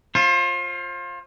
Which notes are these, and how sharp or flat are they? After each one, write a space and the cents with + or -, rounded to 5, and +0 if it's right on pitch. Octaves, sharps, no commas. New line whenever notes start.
F4 +0 C5 +35